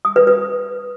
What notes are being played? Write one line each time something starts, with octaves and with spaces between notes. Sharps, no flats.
D#6
B4
B4